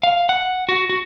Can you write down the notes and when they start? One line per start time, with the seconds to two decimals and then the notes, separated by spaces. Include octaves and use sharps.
0.03 F5
0.29 F#5
0.69 F#4
0.89 F#4